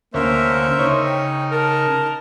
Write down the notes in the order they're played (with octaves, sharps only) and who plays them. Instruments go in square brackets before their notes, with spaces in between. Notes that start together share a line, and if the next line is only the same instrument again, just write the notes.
[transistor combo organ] D2 C#4 [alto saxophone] A#3 [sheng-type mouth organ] A#4 C5 E5
[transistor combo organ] C#3 D#4 [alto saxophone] C#5
[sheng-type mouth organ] G5
[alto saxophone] A#4 [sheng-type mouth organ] A5